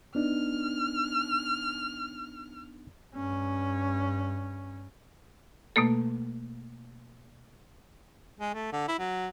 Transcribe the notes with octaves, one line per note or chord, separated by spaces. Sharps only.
B3 D4 D#4 F6
G2 C#4
B2 A3 A#3 A4
G#3
A3
D3
E4
F#3